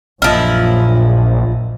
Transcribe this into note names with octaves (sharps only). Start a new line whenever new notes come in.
A#1 F#2 A#2 F3 E4 D#5 F6